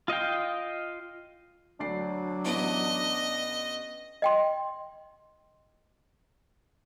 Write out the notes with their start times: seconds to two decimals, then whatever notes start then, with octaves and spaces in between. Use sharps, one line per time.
0.08 F4 D#5 F5 G5
1.80 D2 F#3 D4 D5 C7
2.45 A1 B3 E4 D#5
4.22 D#5 G5 C6